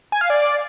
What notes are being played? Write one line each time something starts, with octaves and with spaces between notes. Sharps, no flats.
G#5
F5
D5